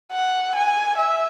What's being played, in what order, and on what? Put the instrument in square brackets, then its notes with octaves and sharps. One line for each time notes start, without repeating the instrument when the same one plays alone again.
[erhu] F#5
G#5
E5